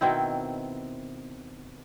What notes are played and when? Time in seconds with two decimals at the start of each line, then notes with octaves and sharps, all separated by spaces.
0.01 B2 D#3 C4 E4